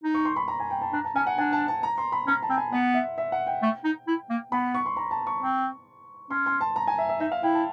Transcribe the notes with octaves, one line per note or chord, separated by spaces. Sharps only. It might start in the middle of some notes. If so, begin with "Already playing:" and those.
D#4
C#6
C6
B5
A#5
G#5
G5
A5
D4 A#5
A5
C#4 G#5
F#5
D4 G#5
A5
A5
A#5
C6
B5
C#4 A#5
A5
C4
G#5
B3 F#5
E5
E5
F#5
G5
A3
D#4
E4
A#3
B3 B5
C#6
C6
A#5
A5
C#6
C4
C#4 C6
C6
A5
A#5
G#5
E5
E5
D#4 E5
F5
E4 G5
A5